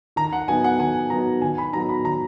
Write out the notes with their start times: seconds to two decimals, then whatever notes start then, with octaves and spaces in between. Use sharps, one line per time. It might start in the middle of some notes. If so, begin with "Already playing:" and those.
0.16 D#3 A#5
0.33 F#5
0.48 F#3 B3 D#4 G#5
0.64 F#5
0.79 D#3 G#5
1.10 F#3 B3 D#4 A#5
1.42 D#3 G#5
1.58 B5
1.73 F#3 B3 D#4 A#5
1.89 B5
2.04 D#3 A#5